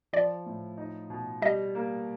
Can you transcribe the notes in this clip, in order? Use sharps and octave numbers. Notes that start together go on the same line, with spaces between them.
F3 D5
A2
D#4
B2
G3 D#5
A#3